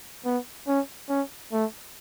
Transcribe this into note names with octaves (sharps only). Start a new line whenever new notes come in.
B3
C#4
C#4
A3